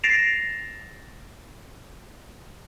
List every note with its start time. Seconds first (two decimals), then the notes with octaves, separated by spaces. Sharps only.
0.04 A6 A#6 C7 D7 E7 F7